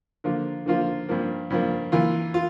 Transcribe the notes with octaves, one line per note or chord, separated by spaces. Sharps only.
D3 F3 A#3 F4
D3 F3 A#3 F4
G2 F3 A#3
G2 F3 A#3
E3 A#3 F4
F4